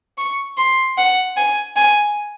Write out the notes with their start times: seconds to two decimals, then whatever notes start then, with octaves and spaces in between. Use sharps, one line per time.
0.18 C#6
0.57 C6
0.98 F#5
1.37 G#5
1.76 G#5